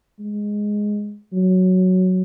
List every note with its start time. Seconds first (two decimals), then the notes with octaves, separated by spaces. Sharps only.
0.20 G#3
1.32 F#3